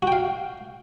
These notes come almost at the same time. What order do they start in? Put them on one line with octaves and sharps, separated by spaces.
F#4 G5 F5